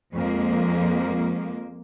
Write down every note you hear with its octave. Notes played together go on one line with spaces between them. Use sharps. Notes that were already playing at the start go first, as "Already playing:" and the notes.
F2 F3 G#3 A#3